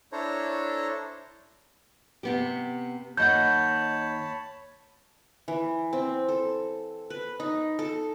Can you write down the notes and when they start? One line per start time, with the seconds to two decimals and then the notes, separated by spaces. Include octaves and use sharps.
0.12 D4 E4 A4 C5 C#5 A#5
2.23 C3 B3 G4
3.17 D#2 C#5 D#5 F#5 A5 B5 G6
5.48 E3
5.93 C4
6.28 A4
7.10 B4
7.40 D#4
7.79 A4